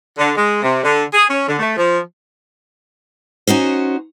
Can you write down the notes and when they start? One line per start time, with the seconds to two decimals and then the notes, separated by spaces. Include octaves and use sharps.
0.18 D3
0.36 G#3
0.63 C3
0.84 D3
1.14 G#4
1.30 C#4
1.48 D3
1.59 A3
1.77 F3
3.47 C#4 D#4 F#4 C5